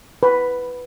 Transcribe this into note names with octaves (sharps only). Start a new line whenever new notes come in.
B4